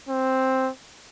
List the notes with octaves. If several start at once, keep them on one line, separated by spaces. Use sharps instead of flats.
C4